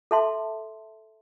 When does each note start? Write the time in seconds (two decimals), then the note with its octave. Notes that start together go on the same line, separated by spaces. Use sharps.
0.11 A4 E5 A5 C6